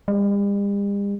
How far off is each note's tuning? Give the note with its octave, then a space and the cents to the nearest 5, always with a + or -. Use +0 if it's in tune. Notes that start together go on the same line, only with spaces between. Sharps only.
G3 +45